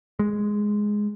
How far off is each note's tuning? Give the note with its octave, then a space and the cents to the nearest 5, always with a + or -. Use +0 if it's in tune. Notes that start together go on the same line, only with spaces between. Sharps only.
G#3 +0